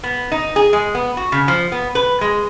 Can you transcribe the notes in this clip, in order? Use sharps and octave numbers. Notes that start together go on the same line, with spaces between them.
B3
D#4
G#4
G#3
B3
F#4
C#3
F3
B3
B4
G#3